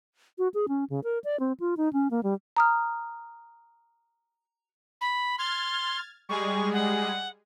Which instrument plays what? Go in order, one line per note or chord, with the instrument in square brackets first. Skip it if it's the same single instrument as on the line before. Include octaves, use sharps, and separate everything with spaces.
[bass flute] F#4
G#4
C#4
C#3
A#4
D5
C4
F4
D#4
C#4
A#3
G3
[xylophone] A#5 D#6 F6
[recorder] B5
[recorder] C6 [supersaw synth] F6 G#6 A6
[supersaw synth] G3 G#3 G#4 [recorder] C#6
[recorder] F#5